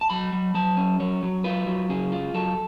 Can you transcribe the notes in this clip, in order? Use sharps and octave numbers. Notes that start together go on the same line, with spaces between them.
A5
F#3 B5
F#3
F#3 A5
C#4
F#3 C#5
F#3
F4 B4
F#3
C#3 G#4
F4
F#3 A4